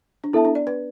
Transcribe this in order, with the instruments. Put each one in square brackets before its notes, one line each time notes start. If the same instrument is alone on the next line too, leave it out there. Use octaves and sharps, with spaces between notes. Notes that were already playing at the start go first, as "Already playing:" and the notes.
[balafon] D4
[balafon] B3 [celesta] E4 A4 E5 A5
[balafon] D4
D5
B4